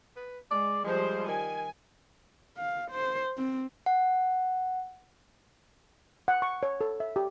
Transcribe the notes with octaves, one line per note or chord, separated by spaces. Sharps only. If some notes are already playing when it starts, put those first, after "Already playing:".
B4
G#3 D5
F3 G3 G#3 C5
D#3 G#5
F5
C5
C4
F#5
F#5
C#6
C#5
A4
E5
G4